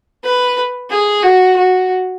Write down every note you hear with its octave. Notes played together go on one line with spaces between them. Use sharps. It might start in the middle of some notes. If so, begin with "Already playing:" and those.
B4
G#4
F#4
F#4